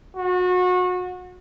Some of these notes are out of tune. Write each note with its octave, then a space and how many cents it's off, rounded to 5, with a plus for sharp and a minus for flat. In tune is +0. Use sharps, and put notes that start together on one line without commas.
F#4 -30